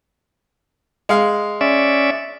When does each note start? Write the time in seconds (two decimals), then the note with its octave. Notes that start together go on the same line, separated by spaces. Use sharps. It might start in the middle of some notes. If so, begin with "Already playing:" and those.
1.09 G#3 F5
1.61 C#4 D5 E5